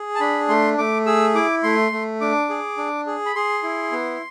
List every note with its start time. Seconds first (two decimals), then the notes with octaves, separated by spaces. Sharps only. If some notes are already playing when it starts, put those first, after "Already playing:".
Already playing: G#4
0.15 A5
0.20 D4 B5
0.48 A3 C6
0.78 A3 D6
1.06 G#4 E6
1.35 E4 D6
1.63 A3 C6
1.92 A3
2.21 D4 D6
2.50 G#4
2.77 D4
3.07 G#4
3.26 B5
3.35 G#4 C6
3.63 E4
3.92 B3